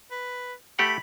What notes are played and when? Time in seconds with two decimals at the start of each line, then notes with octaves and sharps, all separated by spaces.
0.11 B4
0.79 A3 G4 F#5 B5